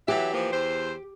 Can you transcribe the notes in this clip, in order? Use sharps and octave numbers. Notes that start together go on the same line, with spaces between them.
E3 F#3 G4 E5
E3 F3 A#3
E2 C5